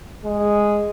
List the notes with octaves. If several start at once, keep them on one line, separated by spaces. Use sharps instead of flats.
G#3